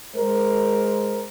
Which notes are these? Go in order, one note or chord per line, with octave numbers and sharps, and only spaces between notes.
G#3 A#4 C5